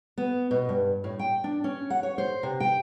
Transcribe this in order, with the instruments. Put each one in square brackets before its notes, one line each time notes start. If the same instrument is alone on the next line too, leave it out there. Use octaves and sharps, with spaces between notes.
[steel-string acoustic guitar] B3
B2
G2
A2
G5
D4
C#4
F#5
C#5
C5
C3
G5